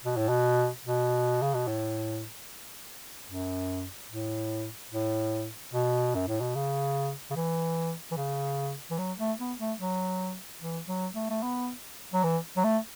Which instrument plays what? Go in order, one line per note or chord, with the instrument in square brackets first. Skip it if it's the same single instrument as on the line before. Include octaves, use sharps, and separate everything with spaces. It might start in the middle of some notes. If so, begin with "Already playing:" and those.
[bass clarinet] B2
A2
B2
B2
C#3
B2
A2
F#2
A2
A2
B2
F#2
A2
B2
C#3
C#3
E3
E3
C#3
E3
F#3
A3
B3
A3
F#3
E3
F#3
A3
A3
B3
F#3
E3
F#3
A3